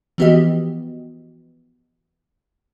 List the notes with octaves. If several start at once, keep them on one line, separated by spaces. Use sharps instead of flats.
E3 F3 B3 F#4 G4 D#5